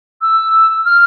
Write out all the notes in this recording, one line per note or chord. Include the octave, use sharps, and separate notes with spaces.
E6
F6